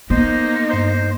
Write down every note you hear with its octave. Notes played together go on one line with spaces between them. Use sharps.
A#3 B3 D#4 C5
G2 C5 G6